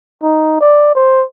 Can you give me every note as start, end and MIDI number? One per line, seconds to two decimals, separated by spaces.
0.23 0.60 63
0.60 0.93 74
0.95 1.24 72